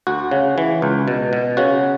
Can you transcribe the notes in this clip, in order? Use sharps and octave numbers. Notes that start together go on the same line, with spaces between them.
D2 F#4
C#3
E3
C#2
B2
B2
C#3 F#4